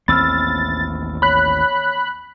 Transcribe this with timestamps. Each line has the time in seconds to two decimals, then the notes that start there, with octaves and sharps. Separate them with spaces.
0.08 A1 D#2 C4 B5 E6 F6 A6
1.22 C#5 B5 F#6